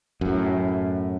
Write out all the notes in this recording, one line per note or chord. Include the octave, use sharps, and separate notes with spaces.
F#2 A2